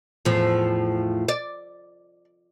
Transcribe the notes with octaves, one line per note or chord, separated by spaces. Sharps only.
E2 A2 F3
D5